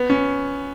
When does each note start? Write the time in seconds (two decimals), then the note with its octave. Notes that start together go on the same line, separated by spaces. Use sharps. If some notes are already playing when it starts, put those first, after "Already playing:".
Already playing: B3
0.10 C#4